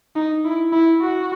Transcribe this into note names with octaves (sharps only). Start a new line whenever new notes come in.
D#4
E4
E4
F#4